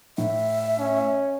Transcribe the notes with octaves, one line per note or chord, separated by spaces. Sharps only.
A2 E5
C#4